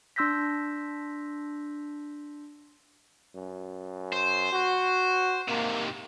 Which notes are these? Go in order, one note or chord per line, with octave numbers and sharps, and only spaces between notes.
D4 C6 E6 G6 A#6 B6
F#2
C5
F#4
G#2 C3 A#3